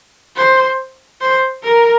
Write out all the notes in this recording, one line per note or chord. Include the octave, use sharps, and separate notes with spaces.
C5
C5
A#4